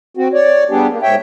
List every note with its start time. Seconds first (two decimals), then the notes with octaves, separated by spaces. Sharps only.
0.17 C4 F#4
0.33 C#5 D5
0.70 G3 B3 D4 G4 G#4
0.90 A#3
1.02 G#2 C#5 E5 G5